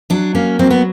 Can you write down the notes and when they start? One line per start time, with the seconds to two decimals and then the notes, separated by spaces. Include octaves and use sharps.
0.10 F#3 D4
0.35 A#3 C#4
0.59 F#3 C4
0.70 B3